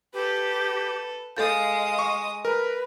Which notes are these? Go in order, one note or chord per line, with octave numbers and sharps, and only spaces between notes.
G4 A4 B4
G#3 A4 F5 D#6 G6
C#6
A#4 B4